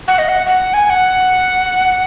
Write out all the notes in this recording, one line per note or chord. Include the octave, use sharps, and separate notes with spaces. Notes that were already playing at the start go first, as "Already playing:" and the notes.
F#5
D#5
F#5
F#5
G#5
G#5
F#5